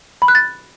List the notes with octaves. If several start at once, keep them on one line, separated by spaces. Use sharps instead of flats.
B5
F#6
A6